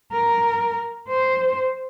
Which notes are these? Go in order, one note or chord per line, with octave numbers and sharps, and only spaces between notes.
A#4
C5